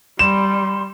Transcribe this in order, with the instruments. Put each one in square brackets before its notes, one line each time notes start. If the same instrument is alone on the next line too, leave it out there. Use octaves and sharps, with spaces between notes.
[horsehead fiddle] G3 [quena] C6 [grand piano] E7